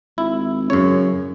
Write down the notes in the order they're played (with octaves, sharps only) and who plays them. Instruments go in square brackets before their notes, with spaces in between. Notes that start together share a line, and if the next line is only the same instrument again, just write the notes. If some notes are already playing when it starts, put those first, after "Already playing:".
[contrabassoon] G#1 [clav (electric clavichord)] E4
[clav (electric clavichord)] F#2 C#5 [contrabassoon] C#3